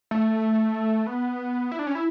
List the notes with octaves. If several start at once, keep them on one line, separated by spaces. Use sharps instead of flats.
A3
B3
E4
D4
C#4
E4